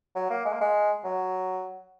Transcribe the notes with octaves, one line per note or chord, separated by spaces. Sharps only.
F#3
A#3
G#3
A#3
G#3
F#3